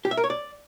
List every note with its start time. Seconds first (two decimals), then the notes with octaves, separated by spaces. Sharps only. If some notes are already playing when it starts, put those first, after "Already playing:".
0.05 G4
0.11 E5
0.17 A#4
0.24 C#5
0.30 D5